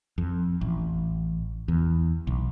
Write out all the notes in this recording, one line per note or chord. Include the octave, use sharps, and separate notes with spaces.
F2
A1
E2
B1